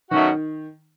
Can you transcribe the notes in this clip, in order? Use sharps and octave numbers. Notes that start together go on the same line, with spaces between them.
B2 D#3 F#3 A3 C#4 F#4